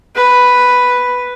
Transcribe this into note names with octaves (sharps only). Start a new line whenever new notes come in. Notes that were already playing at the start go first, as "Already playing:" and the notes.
B4